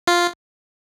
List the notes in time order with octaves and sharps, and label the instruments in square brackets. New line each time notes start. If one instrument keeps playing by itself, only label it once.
[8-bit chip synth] F4